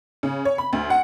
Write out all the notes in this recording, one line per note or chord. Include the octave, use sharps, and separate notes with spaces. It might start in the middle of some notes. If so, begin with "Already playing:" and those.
C#3
C#5
B5
D2
F#5